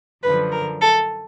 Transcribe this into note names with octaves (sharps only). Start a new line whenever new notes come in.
F#2 D3 F3 B4
A#4
A4